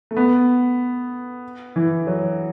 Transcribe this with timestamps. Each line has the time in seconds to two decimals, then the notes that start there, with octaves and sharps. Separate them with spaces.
0.11 A3
0.17 B3
1.76 E3
2.07 F#3